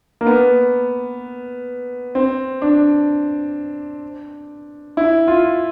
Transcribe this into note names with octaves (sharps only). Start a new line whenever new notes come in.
A#3
B3
C4
D4
E4
F4